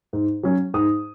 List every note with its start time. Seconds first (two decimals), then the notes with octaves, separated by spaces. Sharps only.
0.13 G#2
0.43 F#3 C#4
0.74 G#2 D#6